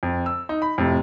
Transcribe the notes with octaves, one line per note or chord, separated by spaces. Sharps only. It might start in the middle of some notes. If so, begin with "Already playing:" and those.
F2
E6
D#4
B5
F2 A2 C3